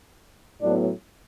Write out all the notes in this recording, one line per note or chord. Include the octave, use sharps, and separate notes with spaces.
A2 F#3 B3 D4